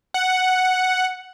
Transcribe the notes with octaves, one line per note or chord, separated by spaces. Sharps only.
F#5